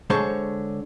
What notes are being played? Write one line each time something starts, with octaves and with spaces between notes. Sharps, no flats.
D3 G#3 C5 C#5 A5